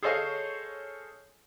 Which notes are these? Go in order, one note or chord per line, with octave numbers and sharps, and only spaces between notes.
G#4 A4 C5 C#5 D#5 F5